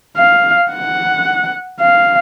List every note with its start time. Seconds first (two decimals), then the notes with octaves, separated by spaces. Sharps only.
0.17 F5
0.72 F#5
1.81 F5